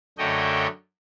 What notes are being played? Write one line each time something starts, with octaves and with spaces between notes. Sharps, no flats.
F#2 D3 A3 C#5 D#5 G5